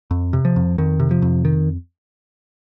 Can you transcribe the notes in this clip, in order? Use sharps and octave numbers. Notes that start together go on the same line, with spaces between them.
F2
C3
F3
F2
F2 D#3
C3
F3
F2
D#3